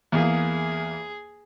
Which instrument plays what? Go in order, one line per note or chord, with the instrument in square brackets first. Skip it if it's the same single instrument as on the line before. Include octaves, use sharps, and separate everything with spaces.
[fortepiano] E2 A#3 [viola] G#4